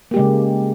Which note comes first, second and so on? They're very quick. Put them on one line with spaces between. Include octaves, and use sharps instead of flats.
A#3 G4 G#3 C#3